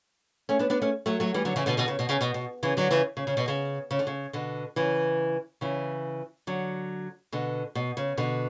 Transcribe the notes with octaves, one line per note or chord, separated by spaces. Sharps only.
A3 C#4
B3 D4
B3 D4
A3 C#4
F#3 A3
F#3 A3
E3 G3
D3 F#3
C#3 E3
B2 D3
B2 D3
C#3
B2
C#3
B2
B2
C#3 E3
D3 F#3
C#3 E3
C#3
C#3
B2
C#3
C#3
D3
C#3
B2 D3
C#3 E3
C#3 E3
D3 F#3
B2 D3
B2
C#3
B2 D3